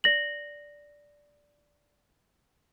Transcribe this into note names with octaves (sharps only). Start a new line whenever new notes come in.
D5 A#6 F#7